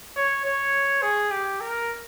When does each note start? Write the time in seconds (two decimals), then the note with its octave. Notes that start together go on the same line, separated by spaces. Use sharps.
0.16 C#5
0.46 C#5
1.02 G#4
1.31 G4
1.61 A#4